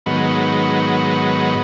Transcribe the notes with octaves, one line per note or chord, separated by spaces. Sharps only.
G#2 D#3 F#3 B3